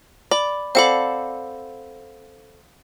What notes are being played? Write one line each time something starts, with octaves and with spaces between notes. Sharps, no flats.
D5 B5
C4 A4 D5 F5 F#5 B5